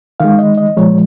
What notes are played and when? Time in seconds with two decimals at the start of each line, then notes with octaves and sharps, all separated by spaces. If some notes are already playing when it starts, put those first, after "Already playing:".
0.20 D#3 G#3 F5
0.39 D#5
0.57 D#5
0.77 A#2 F3 G#3 C#5